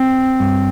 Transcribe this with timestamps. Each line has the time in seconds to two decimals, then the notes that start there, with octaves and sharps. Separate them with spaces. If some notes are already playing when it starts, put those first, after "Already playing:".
Already playing: C4
0.40 G2